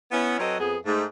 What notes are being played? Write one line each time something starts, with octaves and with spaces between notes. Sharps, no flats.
B3 C#4 E4
F#3 C4 A4 B4 C#5 D#5
F2 B3 G#4
G#2 A3